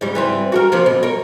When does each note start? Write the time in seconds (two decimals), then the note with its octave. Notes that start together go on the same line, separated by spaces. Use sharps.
0.01 G#2 C#3 G3
0.15 E3 G3 C4
0.52 F#4 G#4 A#4
0.72 C3 F3 A#3
0.86 B2
1.03 A#4 C#5